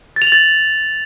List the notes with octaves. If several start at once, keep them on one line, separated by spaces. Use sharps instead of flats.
A6
F7
F#7
A6